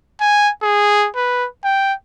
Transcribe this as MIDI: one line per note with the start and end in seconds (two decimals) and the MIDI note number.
0.21 0.50 80
0.62 1.07 68
1.16 1.47 71
1.64 1.94 79